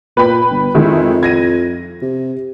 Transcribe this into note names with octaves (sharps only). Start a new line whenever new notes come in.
A#2 B4 G5 B5
G1
F2 D#3 G#3 E4
G#6 A#6 D#7
C3